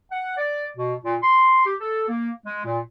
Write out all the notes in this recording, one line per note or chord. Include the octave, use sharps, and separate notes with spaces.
F#5
D5
B2
A#2
C6
G4
A4
A#3
G#3
A#2